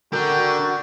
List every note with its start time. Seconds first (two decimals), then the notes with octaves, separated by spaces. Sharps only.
0.13 D3 D4 F#4 A#4 G5